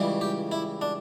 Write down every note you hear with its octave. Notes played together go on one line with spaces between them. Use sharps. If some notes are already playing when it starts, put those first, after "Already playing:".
Already playing: C#2 C#3 E3 G3
G4
E4
D4